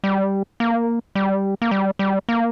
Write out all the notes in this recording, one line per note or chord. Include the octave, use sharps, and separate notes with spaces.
G3
A#3
G3
A#3
G3
G3
A#3